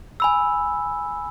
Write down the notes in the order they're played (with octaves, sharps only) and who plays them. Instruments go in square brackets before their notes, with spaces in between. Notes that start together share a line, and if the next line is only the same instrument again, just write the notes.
[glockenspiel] G#5 B5 E6